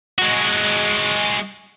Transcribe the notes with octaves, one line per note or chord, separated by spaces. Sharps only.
G#3 F#4